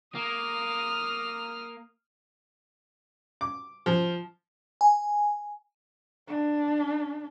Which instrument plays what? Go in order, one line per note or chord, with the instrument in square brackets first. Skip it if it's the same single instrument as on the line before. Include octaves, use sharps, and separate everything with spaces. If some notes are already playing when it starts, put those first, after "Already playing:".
[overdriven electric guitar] A#3 [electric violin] D#6 F6
[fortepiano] D6
F3
[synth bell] G#5
[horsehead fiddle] D4